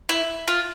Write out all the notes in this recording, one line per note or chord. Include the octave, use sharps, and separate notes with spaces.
E4
F4